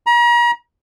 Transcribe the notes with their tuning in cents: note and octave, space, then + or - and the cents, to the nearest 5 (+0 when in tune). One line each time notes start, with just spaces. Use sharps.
A#5 +40